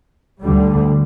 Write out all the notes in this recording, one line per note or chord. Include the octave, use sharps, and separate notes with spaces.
D2 D3 G3